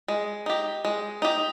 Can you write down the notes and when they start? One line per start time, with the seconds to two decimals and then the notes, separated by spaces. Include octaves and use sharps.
0.08 G#3
0.46 D#4 G4
0.85 G#3
1.22 D#4 G4